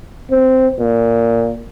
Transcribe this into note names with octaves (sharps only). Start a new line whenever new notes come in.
C4
A#2